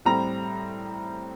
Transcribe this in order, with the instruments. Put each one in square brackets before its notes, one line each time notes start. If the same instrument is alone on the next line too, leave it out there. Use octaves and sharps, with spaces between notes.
[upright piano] A2 G3 C4 A#5